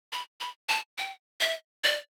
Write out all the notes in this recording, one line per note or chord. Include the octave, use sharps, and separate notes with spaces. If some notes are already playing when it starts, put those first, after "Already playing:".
B5
B5
A5
G5
E5
D5